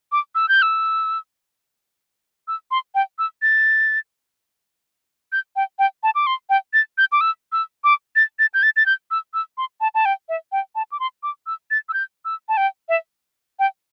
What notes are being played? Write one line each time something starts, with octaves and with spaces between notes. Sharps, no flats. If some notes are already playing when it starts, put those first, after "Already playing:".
D6
E6
G6
E6
E6
C6
G5
E6
A6
G6
G5
G5
A5
D6
C6
G5
A6
G6
D6
E6
E6
D6
A6
A6
G6
A6
A6
G6
E6
E6
C6
A5
A5
G5
E5
G5
A5
D6
C6
D6
E6
A6
E6
G6
E6
A5
G5
E5
G5